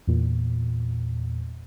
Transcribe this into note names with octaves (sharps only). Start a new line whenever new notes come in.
E2 A#2